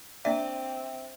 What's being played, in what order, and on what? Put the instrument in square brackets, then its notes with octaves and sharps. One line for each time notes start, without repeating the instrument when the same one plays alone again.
[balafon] A#3 D4 D5 [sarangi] C4 [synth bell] E5